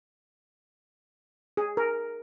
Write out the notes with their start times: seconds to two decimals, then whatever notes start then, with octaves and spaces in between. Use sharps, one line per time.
1.57 G#4
1.77 A#4